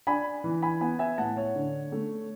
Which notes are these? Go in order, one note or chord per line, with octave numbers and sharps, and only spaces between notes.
D4 G#5 B5
E3
G#5 B5
B3 G#5 B5
E5 G#5
A2 F#5 A5
C#5
D3
A3